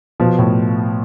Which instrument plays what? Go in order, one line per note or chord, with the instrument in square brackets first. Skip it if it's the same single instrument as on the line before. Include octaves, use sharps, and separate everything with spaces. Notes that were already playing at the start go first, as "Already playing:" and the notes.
[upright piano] B2 [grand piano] F3
[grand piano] A2